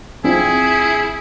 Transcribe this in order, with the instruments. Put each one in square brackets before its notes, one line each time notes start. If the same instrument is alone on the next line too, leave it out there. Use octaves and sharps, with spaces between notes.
[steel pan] C4 D4 F4 [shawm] E4 [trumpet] G#4